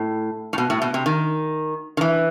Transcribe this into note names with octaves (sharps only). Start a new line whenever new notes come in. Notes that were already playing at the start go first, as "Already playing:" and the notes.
Already playing: A2
A2
B2
A2
B2
C3
D#3
D#3
E3